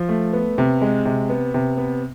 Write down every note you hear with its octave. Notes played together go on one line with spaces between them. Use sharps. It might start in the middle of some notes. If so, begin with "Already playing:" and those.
Already playing: F3
A3
B3
C3
G#3
C3
B3
C3
B3